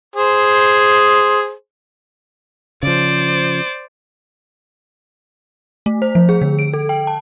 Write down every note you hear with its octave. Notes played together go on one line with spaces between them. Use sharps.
G#4 C5
C#3 F3 C5 D5
A3
C5
F3
G#4
D3
D7
A4
G5
A5